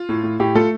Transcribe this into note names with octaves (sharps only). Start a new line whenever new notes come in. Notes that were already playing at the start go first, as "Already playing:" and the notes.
Already playing: F4
A2
A2
A2 G4
A3 F4 A4